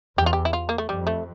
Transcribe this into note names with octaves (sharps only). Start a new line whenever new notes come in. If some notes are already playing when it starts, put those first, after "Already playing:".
E2 G4
F4
G4
E4
F4
A#3
A3
F2 G3
A3